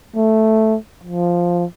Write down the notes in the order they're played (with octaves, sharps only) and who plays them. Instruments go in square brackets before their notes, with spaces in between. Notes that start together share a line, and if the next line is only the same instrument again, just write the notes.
[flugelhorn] A3
F3